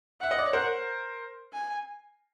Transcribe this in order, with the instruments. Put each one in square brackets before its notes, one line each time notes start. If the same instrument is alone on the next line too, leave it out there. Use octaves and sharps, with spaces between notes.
[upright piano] E5 [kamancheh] F#5
[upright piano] D#5
D5
C#5
A#4 C5
[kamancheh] G#5